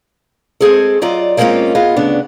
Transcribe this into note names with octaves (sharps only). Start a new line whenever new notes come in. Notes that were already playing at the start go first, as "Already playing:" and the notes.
G#3 C4 G#4 A4
F#3 F4 D5 D#5
G3 G#3 A#3 C4 C#4 F4
B3 F4 G#4 D#5
D2 C#3 B3 D4